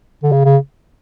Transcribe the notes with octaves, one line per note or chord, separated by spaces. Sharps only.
D3
C#3
C#3